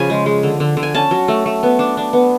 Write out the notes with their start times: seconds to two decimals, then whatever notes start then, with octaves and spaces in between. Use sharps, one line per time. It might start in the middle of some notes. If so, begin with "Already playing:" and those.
Already playing: C#3 F3 G#5 B5
0.10 G#3
0.26 G#3
0.43 D3
0.60 D3
0.77 D3
0.83 G#5
0.95 C#4 A5
1.11 F#3
1.28 A3
1.46 A3
1.63 B3
1.79 D4
1.97 D4
2.13 B3